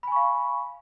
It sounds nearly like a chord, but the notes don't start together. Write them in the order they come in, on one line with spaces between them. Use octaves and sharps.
B5 G#5 C#6 F5